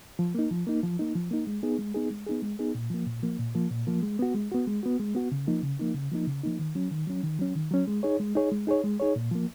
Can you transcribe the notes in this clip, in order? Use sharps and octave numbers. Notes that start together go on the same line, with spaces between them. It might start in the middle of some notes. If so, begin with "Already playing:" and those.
F3
A#3 D#4
F3
A#3 D#4
F3
A#3 D#4
F3
A#3 D#4
G#3
B3 D#4 G#4
G#3
B3 D#4 G#4
G#3
B3 D#4 G#4
G#3
B3 D#4 G#4
A#2
F3 A#3
A#2
F3 A#3
A#2
F3 A#3
A#2
F3 A#3
G#3
B3 F#4
G#3
B3 F#4
G#3
B3 F#4
G#3
B3 F#4
C#3
F3 A#3 D#4
C#3
F3 A#3 D#4
C#3
F3 A#3 D#4
C#3
F3 A#3 D#4
D#3
F#3 C#4
D#3
F#3 C#4
D#3
F#3 C#4
D#3
F#3 C#4
G#3
D#4 G#4 C#5
G#3
D#4 G#4 C#5
G#3
D#4 G#4 C#5
G#3
D#4 G#4 C#5
A#2
F3 A#3